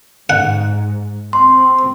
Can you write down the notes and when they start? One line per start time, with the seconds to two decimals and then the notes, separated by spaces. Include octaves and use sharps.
0.30 G#2 F#5
1.33 C4 C6